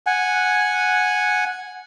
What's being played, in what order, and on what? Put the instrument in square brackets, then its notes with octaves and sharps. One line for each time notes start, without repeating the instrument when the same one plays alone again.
[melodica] F#5 G#5